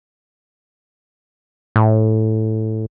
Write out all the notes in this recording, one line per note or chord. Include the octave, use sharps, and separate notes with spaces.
A2